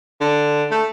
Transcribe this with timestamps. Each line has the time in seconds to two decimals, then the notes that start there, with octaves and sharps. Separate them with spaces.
0.21 D3
0.71 A3